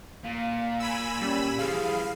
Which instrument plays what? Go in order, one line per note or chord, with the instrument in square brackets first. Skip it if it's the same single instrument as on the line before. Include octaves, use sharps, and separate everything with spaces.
[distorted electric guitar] A#2 [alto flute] F5
[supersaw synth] G#5 B5 E6
[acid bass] G3 [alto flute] C#4
[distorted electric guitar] E3 F3 [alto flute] G#4 [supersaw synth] F5